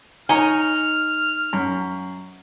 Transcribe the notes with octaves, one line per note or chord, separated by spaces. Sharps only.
D#4 C#5 D#5 G#5 A#5 F6
F#2